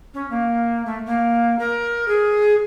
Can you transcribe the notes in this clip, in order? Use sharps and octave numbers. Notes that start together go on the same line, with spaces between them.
C#4
A#3
A3
A#3
A#4
G#4